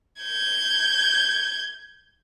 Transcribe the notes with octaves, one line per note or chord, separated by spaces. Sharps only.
G6 G#6